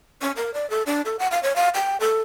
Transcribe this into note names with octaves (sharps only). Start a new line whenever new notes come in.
C#4
A#4
D5
A4
D4
A4
F#5
F5
C#5
F5
G5
A4